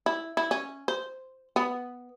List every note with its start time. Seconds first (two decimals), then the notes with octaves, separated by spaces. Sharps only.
0.06 E4
0.37 E4
0.51 C#4
0.88 C5
1.56 B3